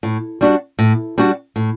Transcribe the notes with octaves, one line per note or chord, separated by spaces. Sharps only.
A2
G3 D4 F#4
A2
G3 D4 F#4
A2